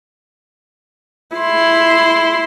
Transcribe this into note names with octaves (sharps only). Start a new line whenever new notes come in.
E4 C6